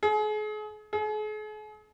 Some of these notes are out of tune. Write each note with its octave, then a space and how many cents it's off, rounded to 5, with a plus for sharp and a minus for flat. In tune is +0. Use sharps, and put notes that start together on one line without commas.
G#4 +40
G#4 +45